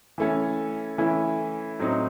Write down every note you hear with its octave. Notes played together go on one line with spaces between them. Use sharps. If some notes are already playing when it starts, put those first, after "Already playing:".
E3 A3 C#4
E3 A3 C#4 E4
A2 F#3 C4 D#4